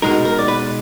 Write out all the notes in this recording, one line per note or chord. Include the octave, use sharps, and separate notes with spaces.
B2 G#3 D#4 A#4
A#4
D5
B4